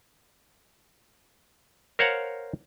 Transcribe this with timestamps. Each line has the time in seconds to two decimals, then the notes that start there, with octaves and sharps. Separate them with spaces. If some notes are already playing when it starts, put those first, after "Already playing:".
1.99 A#4 C5 C#5 F5 F#5 A#5